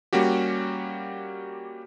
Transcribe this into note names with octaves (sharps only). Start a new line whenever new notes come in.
G3 A#3 C#4 F#4 G4